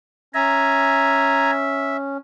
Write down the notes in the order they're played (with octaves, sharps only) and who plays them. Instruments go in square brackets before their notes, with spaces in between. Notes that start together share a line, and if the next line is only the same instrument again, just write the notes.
[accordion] C#4 [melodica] E5 [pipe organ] G#5 A#5